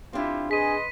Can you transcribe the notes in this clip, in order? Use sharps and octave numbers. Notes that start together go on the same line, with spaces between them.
C4 D4 E4 F4 G4
G#4 B4 D#5 C6 B6 D#7